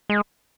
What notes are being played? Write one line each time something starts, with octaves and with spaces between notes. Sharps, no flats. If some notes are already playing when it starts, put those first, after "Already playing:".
G#3